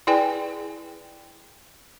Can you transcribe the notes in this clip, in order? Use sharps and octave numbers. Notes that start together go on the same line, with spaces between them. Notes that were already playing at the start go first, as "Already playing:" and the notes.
E4 G#4 B4 D5 G5 G#5